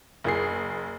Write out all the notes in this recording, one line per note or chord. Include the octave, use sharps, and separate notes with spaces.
F#1 G#4 C7